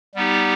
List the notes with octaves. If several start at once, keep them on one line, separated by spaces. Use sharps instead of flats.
G3 B3 D#4 G4